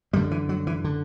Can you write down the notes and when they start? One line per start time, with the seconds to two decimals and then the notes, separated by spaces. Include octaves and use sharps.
0.13 F#2 G3
0.16 D3
0.31 E3
0.49 F#3
0.67 E3
0.84 D3